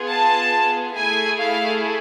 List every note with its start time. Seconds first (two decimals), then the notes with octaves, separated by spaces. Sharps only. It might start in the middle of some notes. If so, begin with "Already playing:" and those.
Already playing: B3 F4 G#4
0.08 A5
0.96 A3 E4 G#4 G#5
1.39 F5